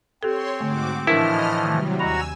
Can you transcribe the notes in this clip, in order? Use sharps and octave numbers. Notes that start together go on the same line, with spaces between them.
C4 G4 A4 C#5 C6
G#2 D3 A3 F#4 D6
A2 E3 F3 D4 E4 A#4 D#5 F6
C3 D#3 F#3 G3 A3
D#2 F#4 G#5 A#5 B5 E6